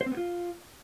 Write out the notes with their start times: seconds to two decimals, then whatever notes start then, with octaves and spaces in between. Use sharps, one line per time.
0.01 C5
0.06 C4
0.12 B3
0.17 F4